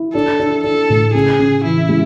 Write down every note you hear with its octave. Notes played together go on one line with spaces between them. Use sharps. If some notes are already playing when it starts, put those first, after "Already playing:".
Already playing: E4
D4 A4
D4
D4 A4
A2
C#3 G#4
C#3
E3 E4
G#3